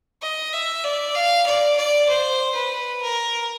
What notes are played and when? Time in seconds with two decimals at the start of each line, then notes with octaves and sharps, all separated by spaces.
0.22 D#5
0.53 E5
0.84 D5
1.15 F5
1.47 D5
1.77 D5
2.09 C5
2.55 B4
3.02 A#4